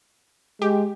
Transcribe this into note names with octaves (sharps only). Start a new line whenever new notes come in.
G#3 G4